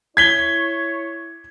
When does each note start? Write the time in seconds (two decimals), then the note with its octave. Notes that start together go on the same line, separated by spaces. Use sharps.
0.17 E4 C#5 G#6 B6 G7